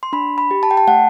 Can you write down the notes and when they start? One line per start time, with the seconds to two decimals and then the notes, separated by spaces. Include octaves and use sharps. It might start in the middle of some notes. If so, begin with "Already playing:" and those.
0.03 C6
0.13 D4 B5
0.38 B5
0.51 G4
0.63 A5
0.71 G5
0.77 A5
0.87 A3 F#5